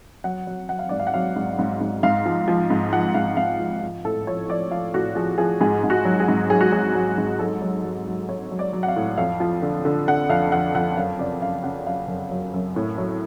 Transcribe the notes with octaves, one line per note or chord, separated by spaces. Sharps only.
F#3 F#5
F#3
F#3 F#5
F5
G#2 D5
F5
F#5
F#3 F5
G#2
G#2
G#2
G#2 F5
F3
F3
G#2
F3 F#5
G#2 F5
G#2 F5
F3
F3
A2 A4
F3 C#5
F3 D5
F3 F5
A2 F#4
F3 G#4
F3 G#4
G#2 G#4
G#2
F#4
F#3
G#4
G#2
F#3 G#4
F#4
F#3 G#4
F#3
G#2
F#3 A4
F#3
F#3
F#3
F#3 C#5
F#3
D5
F#3
F#5
F5
A2
F2 F5
F3
D3
D3
D3 F#5
F2 F5
F2 F#5
F2 F#5
F#2 F5
C#3 D5
F#2 F5
C#3 F#5
F#3 F5
F#2
F#3
F#2
A2
F#3